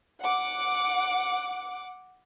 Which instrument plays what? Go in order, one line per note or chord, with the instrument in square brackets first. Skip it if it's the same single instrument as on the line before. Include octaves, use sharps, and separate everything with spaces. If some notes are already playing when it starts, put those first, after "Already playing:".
[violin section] F#5 D6